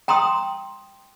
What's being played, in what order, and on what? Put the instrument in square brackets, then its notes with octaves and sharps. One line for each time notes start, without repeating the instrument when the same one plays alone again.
[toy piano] G5 A#5 C6 D#6